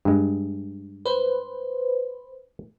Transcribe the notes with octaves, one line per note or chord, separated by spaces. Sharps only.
G2 G#3
B4 C5